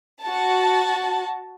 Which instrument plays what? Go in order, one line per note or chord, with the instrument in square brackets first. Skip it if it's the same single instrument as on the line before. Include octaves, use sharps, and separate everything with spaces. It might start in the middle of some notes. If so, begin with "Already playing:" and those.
[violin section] F#4 A5